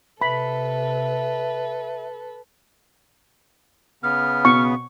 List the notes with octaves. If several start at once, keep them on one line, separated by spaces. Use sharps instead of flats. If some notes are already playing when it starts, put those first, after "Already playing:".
C3 A4 B4 E5 B5
C#3 B3 F6
B2 C#6